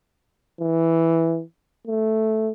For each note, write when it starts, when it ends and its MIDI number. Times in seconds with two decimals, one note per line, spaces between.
0.61 1.42 52
1.87 2.51 57